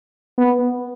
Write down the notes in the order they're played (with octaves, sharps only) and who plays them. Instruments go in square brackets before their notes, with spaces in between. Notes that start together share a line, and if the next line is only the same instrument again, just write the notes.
[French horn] B3